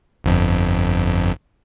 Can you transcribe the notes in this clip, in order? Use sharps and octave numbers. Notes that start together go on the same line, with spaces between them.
G1 F2